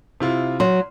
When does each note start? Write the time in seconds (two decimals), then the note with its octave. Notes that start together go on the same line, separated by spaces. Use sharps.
0.20 C3 E4 F4
0.60 F#3 C6